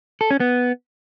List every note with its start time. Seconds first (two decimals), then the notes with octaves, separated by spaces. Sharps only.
0.21 A4
0.31 C#4
0.40 B3